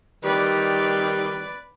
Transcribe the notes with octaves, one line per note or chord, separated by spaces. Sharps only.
D#3 G3 B4 D5